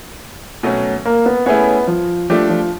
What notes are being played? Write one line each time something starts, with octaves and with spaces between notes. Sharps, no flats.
B2 F#3 A3 C#4
A#3
B3
A3 B3 C#4 E4 G#4 C#5
F3
F3 A3 D4 G4
F3